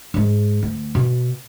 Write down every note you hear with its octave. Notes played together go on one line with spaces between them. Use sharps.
G#2 G#3
D2
B2